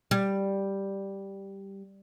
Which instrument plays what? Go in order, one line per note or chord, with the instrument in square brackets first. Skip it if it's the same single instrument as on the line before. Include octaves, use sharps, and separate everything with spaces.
[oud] G3